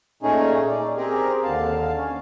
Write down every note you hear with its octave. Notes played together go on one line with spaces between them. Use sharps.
A#2 A3 C#4 D#4 G#4
D5
C4 G4 G#4 A#4
D#2 D3 F5 A5
C#4